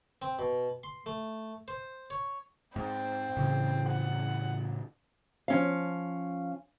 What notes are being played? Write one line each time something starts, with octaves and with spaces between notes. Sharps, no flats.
C4
B2
C6
A3
C5
C#5
G#2 C4
A2 C#3 E3
F#5
F3 C#4 F5